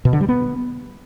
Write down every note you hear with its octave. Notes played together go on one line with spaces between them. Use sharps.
B2
D3
G3
B3